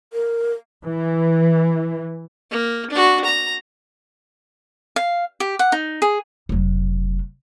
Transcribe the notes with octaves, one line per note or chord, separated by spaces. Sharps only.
A#4
E3
A#3
D4 F#4
A#5
F5
G4
F#5
D#4
G#4
F1 F#3